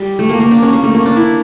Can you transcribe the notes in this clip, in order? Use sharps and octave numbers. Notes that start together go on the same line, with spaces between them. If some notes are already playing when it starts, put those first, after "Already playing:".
Already playing: G3
A3
A#3
A#3
D4
C#4
A#3
A3
A#3
D4
E4